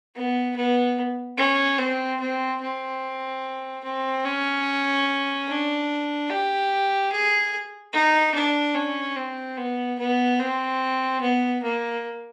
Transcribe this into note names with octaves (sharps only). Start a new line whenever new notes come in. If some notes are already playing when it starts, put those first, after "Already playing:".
B3
B3
C#4
C4
C4
C4
C4
C#4
D4
G4
G#4
D#4
D4
C#4
C4
B3
B3
C4
B3
A#3